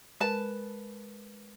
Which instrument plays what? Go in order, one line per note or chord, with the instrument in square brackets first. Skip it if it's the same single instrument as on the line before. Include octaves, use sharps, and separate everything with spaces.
[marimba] G#3 A#4 [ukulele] B4 A5